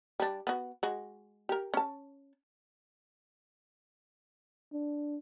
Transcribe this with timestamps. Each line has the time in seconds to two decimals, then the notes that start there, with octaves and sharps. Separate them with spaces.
0.20 G3 D4
0.47 B3 F#4
0.83 G#3 F#4
1.49 G4 A#4
1.74 C#4 A5
4.73 D4